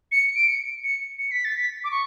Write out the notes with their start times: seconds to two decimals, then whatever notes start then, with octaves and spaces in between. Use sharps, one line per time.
0.12 C#7
0.36 D7
0.48 C#7
0.84 C#7
1.19 C#7
1.31 B6
1.45 A6
1.57 B6
1.84 D6
1.91 C#6